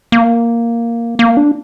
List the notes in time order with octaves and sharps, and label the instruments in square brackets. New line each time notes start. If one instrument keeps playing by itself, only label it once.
[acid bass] A#3
A#3
D4